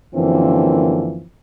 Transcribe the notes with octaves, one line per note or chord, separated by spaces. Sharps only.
F#2 D3 E3 F3 A#3 C4